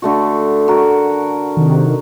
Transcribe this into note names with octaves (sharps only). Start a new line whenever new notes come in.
D3 A3 F#4
F#4 A#4
C3 D#3